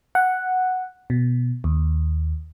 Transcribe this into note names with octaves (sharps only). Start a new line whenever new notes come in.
F#5
B2
D#2